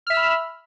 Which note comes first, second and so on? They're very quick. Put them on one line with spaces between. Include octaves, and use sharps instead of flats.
F6 E5 E6 B5